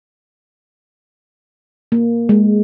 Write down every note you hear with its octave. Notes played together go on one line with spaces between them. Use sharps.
A#3
G#3